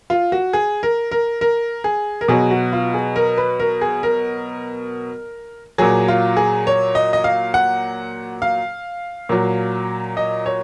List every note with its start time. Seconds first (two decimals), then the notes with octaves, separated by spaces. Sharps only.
0.10 F4
0.32 F#4
0.53 G#4
0.83 A#4
1.11 A#4
1.41 A#4
1.84 G#4
2.21 A#4
2.28 B2 F#3 G#4
2.51 F#4
2.73 F4
2.94 G#4
3.16 A#4
3.38 B4
3.60 A#4
3.81 G#4
4.03 A#4
5.78 A#2 F#3 G#4
6.08 F4
6.37 G#4
6.67 C#5
6.95 D#5
7.13 D#5
7.24 F5
7.54 F#5
8.42 F5
9.29 A#2 F#3
10.17 D#5
10.46 C#5